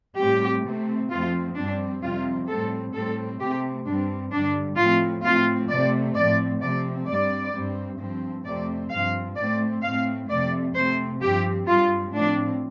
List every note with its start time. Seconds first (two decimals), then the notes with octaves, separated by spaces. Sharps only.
0.18 A2 G3 C4 G4
0.64 C3 A3 C4
1.10 F2 F3 A3 C4 F4
1.56 G2 G3 C4 D4
2.03 F2 C3 G3 C4 F4
2.48 A2 G3 C4 A4
2.94 A2 G3 C4 A4
3.40 C3 A3 C4 G4
3.86 G2 G3 C4 D4
4.32 G2 D3 G3 D4
4.77 A2 F3 A3 C4 F4
5.23 A2 F3 A3 C4 F4
5.69 C3 A3 C4 D5
6.15 A2 F3 C4 D5
6.61 C3 F3 A3 C4 D5
7.07 G2 G3 C4 D5
7.53 G2 G3 C4
7.99 G2 F3 C4
8.45 F2 C3 A3 C4 D5
8.91 G2 F3 C4 F5
9.37 A2 A3 C4 D5
9.83 A2 A3 C4 F5
10.28 F2 C3 A3 C4 D5
10.75 C3 A3 C4 C5
11.21 G2 F3 C4 G4
11.67 G2 G3 C4 F4
12.12 A2 F3 C4 D4